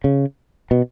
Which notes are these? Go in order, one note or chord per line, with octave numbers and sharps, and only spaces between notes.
C#3
B2